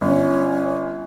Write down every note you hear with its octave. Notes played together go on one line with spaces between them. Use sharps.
G1 C#4